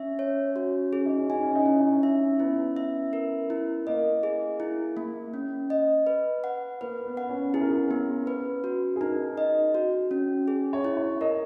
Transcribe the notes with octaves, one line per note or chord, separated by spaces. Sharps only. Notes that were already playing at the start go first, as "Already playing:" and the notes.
Already playing: C#4 E5
C#5
F#4
C#4 G#4
D#4
C#4
D#4 G#5
C#4
D#4
C#4 E4
D#4
C#4
E5
B3 E4
E5
A#4
E4
A#3 D#5
G#4
E4
A#3
C#4
D#5
B4
F#5
A#3 B4
B3
F#5
C#4
E4 G#4
A#4
G#4
B3
B4
F#4
G#4
D#4 A#4
D#5
F#4
C#4
G#4
C#5
E4
C#5
A#4 D#5